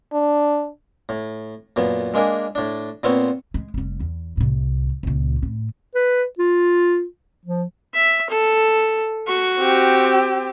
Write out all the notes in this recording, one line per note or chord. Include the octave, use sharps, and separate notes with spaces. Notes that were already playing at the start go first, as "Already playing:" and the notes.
D4
A2
F#2 A#2 B3
G#3 A#3 D4 G#4 A#4
A2 D4
A#2 B3 C4 C5 C#5 F5
G#3
F1 G3
E2
C2 A2
C#2 A#2
A2
B4
F4
F3
E5
A4
F#4 C#6
C4 G4